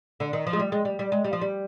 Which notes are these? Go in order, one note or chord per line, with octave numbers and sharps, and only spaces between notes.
D3
D#3
F3
G#3
G3
G#3
G3
G3
G#3
G3
F3
G3